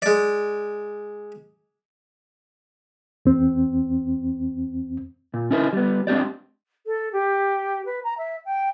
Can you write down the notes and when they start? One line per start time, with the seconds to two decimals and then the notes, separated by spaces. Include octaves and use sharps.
0.02 G#3 D5
3.26 E2 C4
5.34 A#2
5.51 C#4 D#4 E4 A#4
5.73 G3 B3
6.07 G#3 C4 D4 G4 D5
6.86 A4
7.12 G4
7.85 B4
8.03 A#5
8.17 E5
8.45 G5